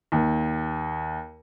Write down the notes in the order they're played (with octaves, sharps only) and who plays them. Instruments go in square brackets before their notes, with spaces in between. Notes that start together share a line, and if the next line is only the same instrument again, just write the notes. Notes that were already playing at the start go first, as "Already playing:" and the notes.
[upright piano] D#2